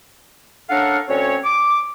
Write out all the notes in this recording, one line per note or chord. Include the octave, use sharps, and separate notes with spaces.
C#4 D4 A4 A#4 F5 F#5
D2 C4 C#4 C#5
D6